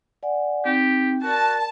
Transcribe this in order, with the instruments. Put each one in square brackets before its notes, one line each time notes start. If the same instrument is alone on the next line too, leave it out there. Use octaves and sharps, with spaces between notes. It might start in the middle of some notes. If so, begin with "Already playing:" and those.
[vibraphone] D5 F#5 G#5
[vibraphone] C4 D#4 G5 [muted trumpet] G4
[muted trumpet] F#4 [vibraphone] A#4 D5 [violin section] A5